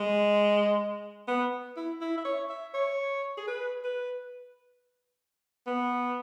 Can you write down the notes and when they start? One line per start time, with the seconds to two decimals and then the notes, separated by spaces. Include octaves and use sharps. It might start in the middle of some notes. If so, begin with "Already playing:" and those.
Already playing: G#3
1.28 B3
1.77 E4
2.01 E4
2.18 E5
2.25 C#5
2.50 E5
2.74 C#5
3.38 G#4
3.48 B4
3.84 B4
5.67 B3